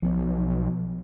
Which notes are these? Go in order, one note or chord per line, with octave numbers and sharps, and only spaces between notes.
B1 F3 B3